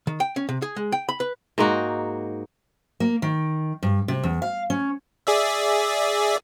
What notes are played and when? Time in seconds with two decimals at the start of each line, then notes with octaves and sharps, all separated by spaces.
0.07 D#3
0.20 G5
0.36 C#4
0.49 C3
0.62 G#4
0.76 G#3
0.92 G5
1.09 B5
1.20 B4
1.58 G#2 A#3 D#4 F#4
3.00 A#3
3.22 D#3
3.83 G2
4.08 C3
4.23 E2
4.42 F5
4.70 C#4
5.27 G#4 D5 E5